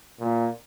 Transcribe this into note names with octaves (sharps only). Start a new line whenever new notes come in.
A#2